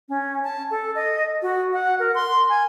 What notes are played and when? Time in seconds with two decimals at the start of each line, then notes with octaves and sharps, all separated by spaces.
0.09 C#4
0.44 A5
0.71 A4
0.95 D#5
1.42 F#4
1.73 F#5
1.99 A#4
2.15 C6
2.49 G#5